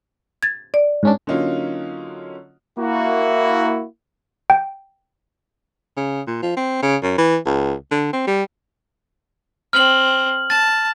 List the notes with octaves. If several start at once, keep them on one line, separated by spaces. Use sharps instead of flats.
G#6 A6
D5
G#2 C#4 D4
D3 F#3 A#3 C#4 D#4 F4
A#3 E4 F#4
G5
C#3
A#2
F3
C4
C#3
F#2
E3
C#2
D3
C4
G3
C4 F6 F#7
A5 A6